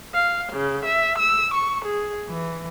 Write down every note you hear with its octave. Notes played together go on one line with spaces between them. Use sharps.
F5
C#3
E5
E6
C#6
G#4
E3